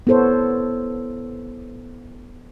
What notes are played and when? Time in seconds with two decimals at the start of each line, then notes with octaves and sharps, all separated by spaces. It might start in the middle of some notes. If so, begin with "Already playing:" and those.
0.07 B3 E4 A4 C5 C#5